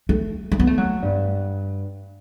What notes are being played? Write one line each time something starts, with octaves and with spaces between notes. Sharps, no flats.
A3
A3
B3
A3
F#3
G2